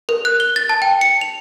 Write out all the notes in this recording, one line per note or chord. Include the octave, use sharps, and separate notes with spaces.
A#4
F#6
G7
A6
A5
G5
C#7
F7